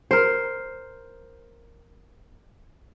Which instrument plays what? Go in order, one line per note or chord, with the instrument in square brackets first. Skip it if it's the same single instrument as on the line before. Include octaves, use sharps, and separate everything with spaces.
[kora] A#4 C5